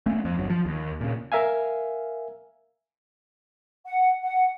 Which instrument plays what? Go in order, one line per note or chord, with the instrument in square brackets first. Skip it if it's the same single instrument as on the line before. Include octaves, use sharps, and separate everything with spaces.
[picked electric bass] A3 A#3 C#4
F2
G1 F#3
F3
D#2
A#2 C#3
[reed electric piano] A#4 E5 F5 G#5
[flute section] F#5
F#5